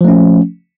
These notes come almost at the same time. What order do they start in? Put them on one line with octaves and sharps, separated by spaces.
F3 A3 C#4